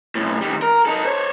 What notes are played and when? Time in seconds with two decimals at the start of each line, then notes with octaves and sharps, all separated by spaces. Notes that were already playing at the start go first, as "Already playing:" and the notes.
0.15 B1 A2
0.41 D#3 G3
0.62 A#4
0.86 D#4 A4
1.05 C5 C#5